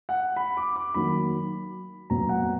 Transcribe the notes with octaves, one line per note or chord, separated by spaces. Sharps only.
F#5
B5
D6
D6
D#3 F#3 A#3 B5
A#2 F#3 B3 A#5
F#5